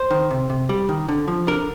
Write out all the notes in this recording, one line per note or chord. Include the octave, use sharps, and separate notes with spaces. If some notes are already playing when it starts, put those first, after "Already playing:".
Already playing: C5
D#3
C3
C3
G3
D#3
D3
F3
D3 A#4